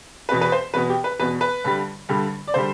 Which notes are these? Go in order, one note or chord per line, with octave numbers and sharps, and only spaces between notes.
E2 B2 B3 B4
B4
C5
E2 B2 B3 B4
G4
B4
E2 B2 B3 B4
B4
G2 D3 G3
G2 D3 G3
D5
D3 G3 C5